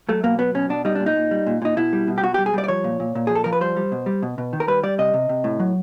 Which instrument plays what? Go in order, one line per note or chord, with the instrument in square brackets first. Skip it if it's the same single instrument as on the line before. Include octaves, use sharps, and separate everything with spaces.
[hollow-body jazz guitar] F#3 A3
B2 A#3
F#3 B3
B2 C#4
B2 D4
G3 D#4
A#2 D4
D#4
A#2
G3
A#2
A#2 D#4
B2 E4
G3
B2
G4
B2 F#4
G4
G3
G#4
G3 D5
D5
F3 C#5
A#2
A#2
A#2
F3 G#4
A4
F3 A#4
B4
G3 C5
G3
B2
G3
B2
B2
D#3
A#4
G3 B4
G3 D5
C3 D#5
C3
C3
A2
F#3